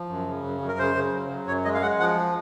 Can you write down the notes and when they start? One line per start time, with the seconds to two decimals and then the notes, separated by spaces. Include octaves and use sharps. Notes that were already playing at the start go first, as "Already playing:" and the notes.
Already playing: F3
0.09 F#2
0.27 C#3
0.44 F#2
0.61 F#2
0.68 A#4
0.79 C#3 C5
0.96 C#3
1.13 F#3
1.30 F#3
1.47 F#2 C#5
1.65 G#3 D#5
1.74 F5
1.82 G#3 F#5
1.99 F3 F#5